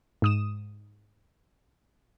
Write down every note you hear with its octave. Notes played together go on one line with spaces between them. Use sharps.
G#2 D#6 E7